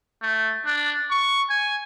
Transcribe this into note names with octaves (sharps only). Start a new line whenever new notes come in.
A3
D4
C#6
G#5